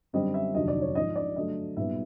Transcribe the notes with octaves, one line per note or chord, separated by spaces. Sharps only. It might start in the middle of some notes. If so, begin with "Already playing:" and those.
F#2 D3 G3 C4 D#5
E5
F1 D#2 D3 F#3 D#5
D5
C#5
A#1 G#2 F3 D#5
D5
G2 D3 F#3 A3 D#5
B1 A#2 G3 B3 E5